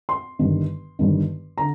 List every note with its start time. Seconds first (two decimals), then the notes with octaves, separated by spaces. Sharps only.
0.09 C6
0.39 G1 G2 D#3
0.99 G1 G2 D#3
1.58 D3 A#5